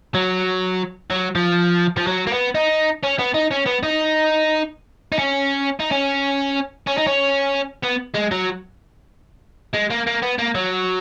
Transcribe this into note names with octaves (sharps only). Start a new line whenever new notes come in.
F#3
F#3
F3
F3
F#3
A#3
B3
D#4
C#4
B3
D#4
C#4
B3
D#4
D#4
C#4
D#4
C#4
C#4
D#4
C#4
B3
G#3
F#3
G#3
A#3
A#3
B3
A#3
F#3